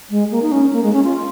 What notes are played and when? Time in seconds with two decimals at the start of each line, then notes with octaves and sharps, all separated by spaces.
0.10 G#3
0.31 A#3
0.42 D#4
0.52 C#4
0.73 A#3
0.83 G#3
0.93 C#4
1.04 F4